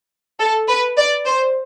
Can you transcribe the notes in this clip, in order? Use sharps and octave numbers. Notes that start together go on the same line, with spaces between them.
A4
B4
D5
C5